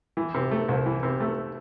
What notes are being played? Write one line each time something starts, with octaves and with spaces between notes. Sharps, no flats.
E3
C3
A3
C2
E3
C3
A3